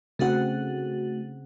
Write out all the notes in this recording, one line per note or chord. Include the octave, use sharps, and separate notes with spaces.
C#3 A3 C4 D#4 F#4 F#5